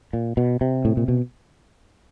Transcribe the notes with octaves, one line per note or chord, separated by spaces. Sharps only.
A#2
B2
C3
A2
A#2
B2